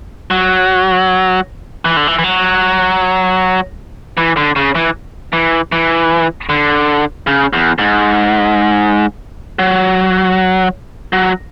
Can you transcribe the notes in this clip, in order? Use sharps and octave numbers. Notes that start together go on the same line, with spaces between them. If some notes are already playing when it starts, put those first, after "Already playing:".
F#3
E3
D3
E3
E3
F#3
E3
D3
C#3
E3
E3
E3
D3
C#3
E2
G#2
F#3
F#3